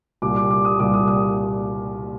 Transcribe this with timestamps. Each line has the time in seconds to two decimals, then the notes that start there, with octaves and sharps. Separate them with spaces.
0.22 C2 A#2 G3 D6
0.36 D6
0.51 D6
0.65 D#6
0.79 C2 A#2 G3 D6
0.94 D#6
1.08 D#6